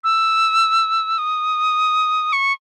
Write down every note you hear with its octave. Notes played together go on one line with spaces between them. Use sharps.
E6
D#6
C#6